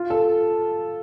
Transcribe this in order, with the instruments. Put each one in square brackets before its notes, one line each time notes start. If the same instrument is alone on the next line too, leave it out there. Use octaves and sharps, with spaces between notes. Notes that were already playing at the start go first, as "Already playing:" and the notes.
Already playing: [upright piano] F4
A4